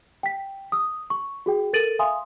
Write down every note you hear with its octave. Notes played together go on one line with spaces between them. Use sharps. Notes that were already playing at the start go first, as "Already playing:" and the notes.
G5 B6
D#6 E6
C#6
F#4 G#4 G5
A4 A#4 A6 D7 D#7 F#7
E5 F5 G#5 C6 D#6